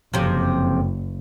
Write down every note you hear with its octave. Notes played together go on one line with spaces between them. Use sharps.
F#1 F2 C3